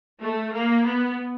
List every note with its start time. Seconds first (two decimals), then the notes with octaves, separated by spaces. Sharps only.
0.21 A3
0.52 A#3
0.85 B3